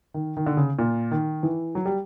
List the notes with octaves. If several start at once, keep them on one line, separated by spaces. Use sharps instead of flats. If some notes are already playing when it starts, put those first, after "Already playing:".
D#3
D#3
D3
C#3
A#2
D#3
E3
F#3
G3